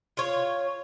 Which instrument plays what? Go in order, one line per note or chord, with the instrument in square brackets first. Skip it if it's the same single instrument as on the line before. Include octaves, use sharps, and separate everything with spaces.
[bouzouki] F4 C#5